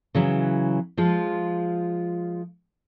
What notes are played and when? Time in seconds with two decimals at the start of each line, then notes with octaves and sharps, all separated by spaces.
0.15 C#3 E3 F#3
0.97 F3 G#3 F4